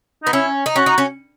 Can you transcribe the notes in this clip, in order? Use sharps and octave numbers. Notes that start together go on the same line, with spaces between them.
B3 D#4
C#4 E4
D#4
C#4 F#4
D#4
C#4